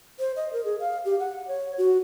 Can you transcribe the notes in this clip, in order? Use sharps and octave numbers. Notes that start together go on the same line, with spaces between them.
C5
D#5
A#4
G#4
F5
G4
F#5
C#5
F#4